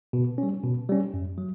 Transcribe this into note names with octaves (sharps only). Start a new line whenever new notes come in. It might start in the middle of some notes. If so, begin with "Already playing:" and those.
B2
C#4
G3
B2
G3 C#4
F#2
F#3